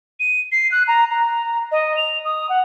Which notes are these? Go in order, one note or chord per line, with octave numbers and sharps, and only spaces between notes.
D#7
C7
F#6
A#5
A#5
D#5
F7
D#6
F#5